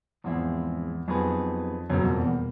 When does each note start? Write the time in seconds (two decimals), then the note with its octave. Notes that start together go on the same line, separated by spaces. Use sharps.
0.24 E2 G#2 F3 G#3 C4 E4
1.08 F2 F#3 B3 D#4 G#4 B4
1.90 F#1 C2 F#2 B2 G3 A#3
2.04 F2
2.18 E2